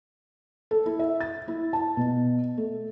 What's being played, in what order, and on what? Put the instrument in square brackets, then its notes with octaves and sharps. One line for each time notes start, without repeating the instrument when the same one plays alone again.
[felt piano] A4
E4
E5
A6
E4
A5
B2
A3